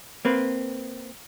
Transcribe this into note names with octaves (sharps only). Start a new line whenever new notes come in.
A#3 C4 B4